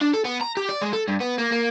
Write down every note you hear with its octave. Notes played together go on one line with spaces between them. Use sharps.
D4
A4
B3
A#5
G4
D5
G#3
A4
G2
B3
A#3
A#3